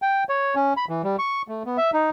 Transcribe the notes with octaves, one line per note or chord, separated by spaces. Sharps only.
G5
C#5
C#4
B5
E3
G3
C#6
A3
B3
E5
D#4